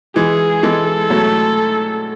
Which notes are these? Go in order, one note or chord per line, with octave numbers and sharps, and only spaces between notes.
E3 G#3 G#4
E3 G#3 A4
F#3 A3